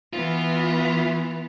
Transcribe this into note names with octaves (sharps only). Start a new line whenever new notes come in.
E3 B3 F4